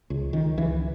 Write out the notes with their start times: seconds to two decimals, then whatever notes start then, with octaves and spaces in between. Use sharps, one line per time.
0.10 C#2
0.33 C#2 D#3
0.57 C#2 E3